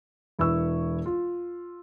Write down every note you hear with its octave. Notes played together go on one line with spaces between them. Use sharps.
E1 E4 B4 C#6 E6
F4